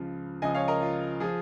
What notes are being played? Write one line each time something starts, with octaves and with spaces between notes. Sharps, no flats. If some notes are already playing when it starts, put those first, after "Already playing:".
Already playing: C#2 C#3 F3
C#2 C#3 F3 D#5 G#5
C#5 F5
A#4 D#5
F4
F3 G#4